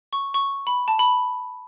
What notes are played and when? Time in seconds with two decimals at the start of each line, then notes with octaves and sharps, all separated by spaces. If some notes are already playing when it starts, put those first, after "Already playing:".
0.13 C#6
0.34 C#6
0.67 B5
0.88 A5
0.99 B5